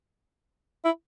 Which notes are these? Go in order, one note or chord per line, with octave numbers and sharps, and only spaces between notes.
E4